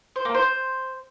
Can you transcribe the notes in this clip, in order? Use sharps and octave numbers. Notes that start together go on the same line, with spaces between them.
C5
A#3
C5